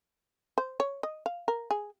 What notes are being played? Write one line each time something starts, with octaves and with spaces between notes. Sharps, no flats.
C5
C#5
D#5
F5
A#4
G#4